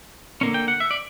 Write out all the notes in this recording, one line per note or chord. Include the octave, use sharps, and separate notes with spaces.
D3 A#3 C#4
G5
F#5
E5
D5